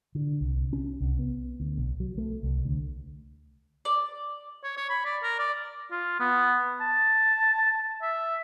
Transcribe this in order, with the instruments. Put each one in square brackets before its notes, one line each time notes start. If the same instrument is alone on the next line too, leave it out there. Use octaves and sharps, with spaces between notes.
[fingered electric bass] D3
C2
C#4
C2
B3
D2
B1
F#3
A3
C2
D2
[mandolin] D5
[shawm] C#5
C#5
B5
D5
A#4
D5
[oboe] F4
B3
A5
E5